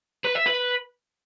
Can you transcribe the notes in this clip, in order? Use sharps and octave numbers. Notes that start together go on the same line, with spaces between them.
B4
E5
B4